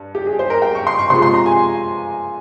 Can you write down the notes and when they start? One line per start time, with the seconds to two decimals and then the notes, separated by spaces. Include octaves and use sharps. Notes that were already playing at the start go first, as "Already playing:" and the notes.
Already playing: G2
0.15 G4
0.26 G#4
0.39 C5
0.50 A#4
0.62 G5
0.75 C#6
0.87 C6
0.99 C#6
1.10 C3 F3 G#3 C6
1.22 C6
1.34 A#5
1.46 G#5